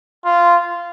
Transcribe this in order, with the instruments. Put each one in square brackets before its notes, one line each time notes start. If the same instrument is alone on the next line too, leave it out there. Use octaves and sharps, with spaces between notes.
[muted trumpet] F4